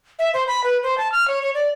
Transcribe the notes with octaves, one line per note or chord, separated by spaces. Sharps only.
E5
C5
B5
B4
C5
A5
F6
C#5
C#5
D5